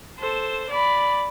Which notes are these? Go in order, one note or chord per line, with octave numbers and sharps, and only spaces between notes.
A4 C5
D5 B5